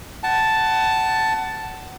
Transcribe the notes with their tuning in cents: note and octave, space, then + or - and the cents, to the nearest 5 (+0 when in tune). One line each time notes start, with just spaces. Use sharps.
F#5 +25 A5 +0